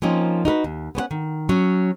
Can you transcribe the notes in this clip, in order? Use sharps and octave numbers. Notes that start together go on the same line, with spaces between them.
F3 A#3 C4 C#4 D#4
D#4 F#4 A#4 B4
D#2
B3 C#4 C5 F#5
D#3
F#3 C#4